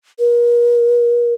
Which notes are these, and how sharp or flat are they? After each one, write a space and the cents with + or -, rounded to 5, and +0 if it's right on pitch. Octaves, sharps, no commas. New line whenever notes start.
A#4 +40